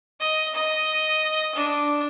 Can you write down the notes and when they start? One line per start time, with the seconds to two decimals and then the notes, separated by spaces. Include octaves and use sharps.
0.20 D#5
0.55 D#5
1.55 D4